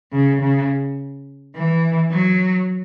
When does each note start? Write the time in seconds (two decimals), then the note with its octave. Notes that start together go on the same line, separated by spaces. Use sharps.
0.13 C#3
0.41 C#3
1.55 E3
2.11 F#3